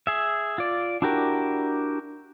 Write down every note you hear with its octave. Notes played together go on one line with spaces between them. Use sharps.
G#4 E5
F4 D5
D4 E4 F#4 G4 A#4